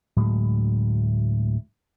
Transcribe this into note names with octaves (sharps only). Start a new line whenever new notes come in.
D2 A2 F#3 G#3